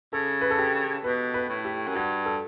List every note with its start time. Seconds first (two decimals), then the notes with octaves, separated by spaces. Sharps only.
0.13 C#3 A4
0.41 B4
0.51 A4
0.58 G4
1.04 B2 B4
1.34 B4
1.49 A2
1.65 G4
1.87 F#2
1.95 G2 F#4
2.26 A4